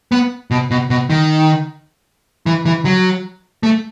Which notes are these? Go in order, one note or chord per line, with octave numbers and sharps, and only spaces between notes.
B3
B2
B2
B2
D#3
E3
E3
F#3
A3